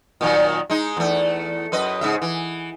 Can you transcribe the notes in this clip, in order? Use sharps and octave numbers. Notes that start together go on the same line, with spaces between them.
A#2 D#3 F#3
G#3 D#4
E2 A3
F#2 B4 D#5
G#2 C#3 E5
E3